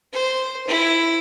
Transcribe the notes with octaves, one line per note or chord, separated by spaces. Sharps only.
C5
E4